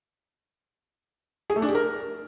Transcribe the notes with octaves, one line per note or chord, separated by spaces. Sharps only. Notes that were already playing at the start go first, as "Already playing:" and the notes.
G#4
A3
D4
G4
A#4